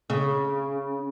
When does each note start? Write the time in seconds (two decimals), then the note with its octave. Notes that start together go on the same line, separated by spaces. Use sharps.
0.10 C#3